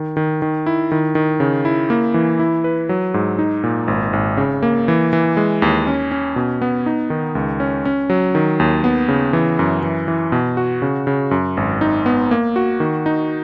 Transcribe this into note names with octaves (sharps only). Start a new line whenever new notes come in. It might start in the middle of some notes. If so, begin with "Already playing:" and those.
Already playing: D#3
D#3
D#3
E4
D#3
D#3
C#3
E4
A#3
E3
E4
B4
F#3
G#2
D#4
A#2
G#1
G#1
C#3
A#3
E3
E3
G#3
D#2
C#4
C#4
B2
B3
D#4
D#3
C#2
C#4
C#4
F#3
D#3
D#2
B3
C#3
E3
F#2
E3
E3
B2
F#4
C#3
C#3
F#2
G#1
D#4
B3
A#3
F#4
D#3
D#4